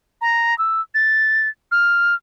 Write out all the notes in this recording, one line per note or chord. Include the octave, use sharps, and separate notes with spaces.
A#5
E6
A6
F6